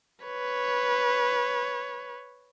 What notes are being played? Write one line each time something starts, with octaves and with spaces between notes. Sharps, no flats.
B4 C#5